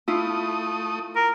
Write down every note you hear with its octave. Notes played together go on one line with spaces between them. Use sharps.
A3 E4 F4 D#6
A#4